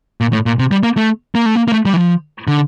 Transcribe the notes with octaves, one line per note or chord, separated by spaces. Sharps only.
A#2
A2
A#2
C3
G3
A#3
A3
A#3
A3
A#3
A#3
A3
G3
E3
F3
D3